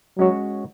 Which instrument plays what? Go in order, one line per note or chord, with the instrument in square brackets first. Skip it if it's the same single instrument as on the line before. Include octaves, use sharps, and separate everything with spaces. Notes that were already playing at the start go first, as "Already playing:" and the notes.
[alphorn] F#3 [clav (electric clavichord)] G#3 C#4 F#4 C#5